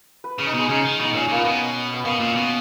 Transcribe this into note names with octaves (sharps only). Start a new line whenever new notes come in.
B4
C#3
D#4
B2 G#3
C#3 D#4
D#3
B2
D#4
A#2 C#4
A#2 A#3
B3
B2
B3
B2 A#3
A#2
B2